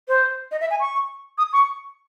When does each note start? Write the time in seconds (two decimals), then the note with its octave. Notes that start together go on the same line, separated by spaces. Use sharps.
0.08 C5
0.51 D#5
0.61 E5
0.71 G#5
0.80 C#6
1.38 D#6
1.53 C#6